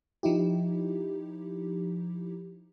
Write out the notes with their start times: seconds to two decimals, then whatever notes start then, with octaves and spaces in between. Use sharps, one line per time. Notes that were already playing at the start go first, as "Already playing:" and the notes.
0.23 F3 D#4 E4 G4